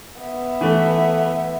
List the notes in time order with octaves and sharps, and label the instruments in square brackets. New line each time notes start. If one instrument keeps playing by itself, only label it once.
[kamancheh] B3 E5
[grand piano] E3 A3